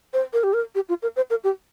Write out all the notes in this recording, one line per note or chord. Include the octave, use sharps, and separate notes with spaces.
C5
A#4
G4
A#4
G4
F4
A#4
C5
A#4
G4